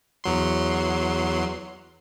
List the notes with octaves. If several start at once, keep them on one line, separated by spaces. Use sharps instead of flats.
E2 F#3 C6